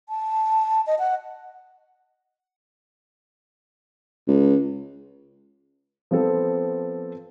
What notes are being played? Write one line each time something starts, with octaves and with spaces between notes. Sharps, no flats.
A5
D#5
F#5
C#2
F3 B3 C4 A4